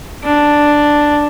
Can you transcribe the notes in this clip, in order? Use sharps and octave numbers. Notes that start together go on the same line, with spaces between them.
D4